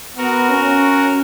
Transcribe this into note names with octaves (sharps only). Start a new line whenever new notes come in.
B3 F#4 A#4
C#4